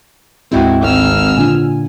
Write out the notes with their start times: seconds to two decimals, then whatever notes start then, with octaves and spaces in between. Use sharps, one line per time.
0.52 D2 G#2 G#3 C4 E4 F#4 G5
0.83 G#1 E6 F6
1.37 A#2 D3 G#5